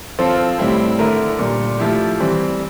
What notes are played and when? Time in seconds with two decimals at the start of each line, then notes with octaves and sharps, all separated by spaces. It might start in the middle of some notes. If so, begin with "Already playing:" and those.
0.19 F3 C4 F4 A4 C5
0.59 A2 G3 C4 E4
0.99 D3 A3 E4 A#4
1.39 A#2 G3 D4
1.79 F3 A3 E4 G4
2.20 E3 G3 C4